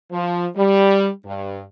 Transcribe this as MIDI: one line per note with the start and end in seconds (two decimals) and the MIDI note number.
0.12 0.46 53
0.57 1.09 55
1.25 1.60 43